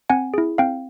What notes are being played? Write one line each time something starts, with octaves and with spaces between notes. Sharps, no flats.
C4 F#5 G#5
E4 G#4
C4 F5 G5